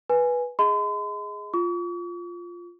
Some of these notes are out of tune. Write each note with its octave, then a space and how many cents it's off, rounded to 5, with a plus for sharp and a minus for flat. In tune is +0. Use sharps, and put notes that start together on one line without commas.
B4 -10 G#5 +0
G#4 +0 D#5 +30 C6 -45
F4 +0 C#6 +45